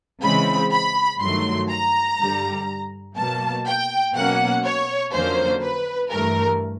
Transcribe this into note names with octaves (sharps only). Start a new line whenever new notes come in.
C#3 E3 G#3 C4 B5
B5
G2 D#3 F#3 A3 C6
A#5
G2 D3 G3
B2 F#3 A#3 A5
G5
B2 F#3 A#3 C#4 F#5
C#5
F2 D3 F#3 A#3 C#4 C5
B4
G2 E3 A3 A#4